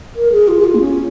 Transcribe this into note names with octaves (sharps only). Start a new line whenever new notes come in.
A#4
G#4
F4
G#4
F4
A#3
C#4